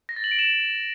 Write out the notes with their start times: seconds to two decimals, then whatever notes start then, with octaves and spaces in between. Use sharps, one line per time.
0.09 A#6
0.16 A6
0.24 F#7
0.31 D7
0.39 E7